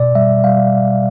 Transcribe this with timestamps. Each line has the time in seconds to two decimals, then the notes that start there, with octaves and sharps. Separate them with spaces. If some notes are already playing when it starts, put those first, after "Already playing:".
Already playing: B2 D5
0.15 G3 E5
0.44 G3 F5